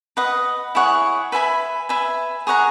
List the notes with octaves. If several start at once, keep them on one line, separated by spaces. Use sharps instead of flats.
B4 D#5 F#5
E4 G#4 C#5 F#5
B4 E5 G#5 B5
B4 E5 G#5
G#4 C#5 F#5 A#5